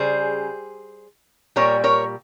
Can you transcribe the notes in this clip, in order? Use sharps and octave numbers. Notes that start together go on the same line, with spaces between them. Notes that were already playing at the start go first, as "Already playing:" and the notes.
Already playing: C#3 G3 G#4 C5
A#2 G3 A#4 C#5
A#4 C#5